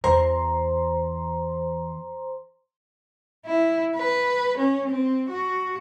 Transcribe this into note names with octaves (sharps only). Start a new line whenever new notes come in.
E2 C5 A#5 C6
E4
B4
C#4
C4
F#4